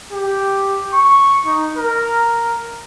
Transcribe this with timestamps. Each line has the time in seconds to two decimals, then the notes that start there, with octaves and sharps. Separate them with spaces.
0.12 G4
0.94 C#6
1.46 D#4
1.78 A#4